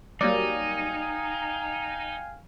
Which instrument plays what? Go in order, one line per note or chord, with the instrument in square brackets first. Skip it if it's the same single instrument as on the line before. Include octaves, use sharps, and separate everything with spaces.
[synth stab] F#3 G3 A#3 [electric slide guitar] D#4 [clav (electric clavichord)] D5 [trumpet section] F5 G5 G#5